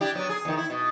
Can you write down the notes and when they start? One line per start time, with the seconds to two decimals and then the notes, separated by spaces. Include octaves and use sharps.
0.01 D4 E4 G4
0.15 F#3 B3 D4
0.29 G#4
0.45 E2 D#3
0.57 E4
0.70 B2